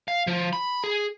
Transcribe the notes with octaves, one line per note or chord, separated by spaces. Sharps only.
F5
F3
B5
G#4